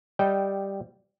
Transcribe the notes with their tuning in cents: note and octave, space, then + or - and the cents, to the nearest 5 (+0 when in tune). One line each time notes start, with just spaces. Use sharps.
G3 +0 D#5 +15 G5 -10